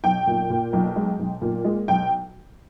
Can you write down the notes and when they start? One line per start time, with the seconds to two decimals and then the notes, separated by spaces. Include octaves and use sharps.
0.04 B1 G5
0.27 A#2
0.50 A#2
0.73 B1
0.96 G#3
1.19 B1
1.42 A#2
1.65 G#3
1.88 B1 G5